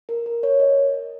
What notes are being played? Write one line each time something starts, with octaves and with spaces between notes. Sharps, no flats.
A#4
A#4
C#5
D#5
D#5
D#5